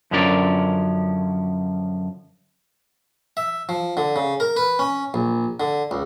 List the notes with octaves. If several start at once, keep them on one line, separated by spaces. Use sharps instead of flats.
F#2 D3 F3 C#4 A#4 D5
E5
F3
D3
C#3
A#4
B4
C#4
A#1
D3
C#2